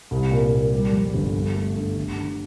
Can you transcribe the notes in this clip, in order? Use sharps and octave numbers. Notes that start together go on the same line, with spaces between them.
C2
A#2
A#2
G3
F2
G1
G2
A3
G2
D3
D3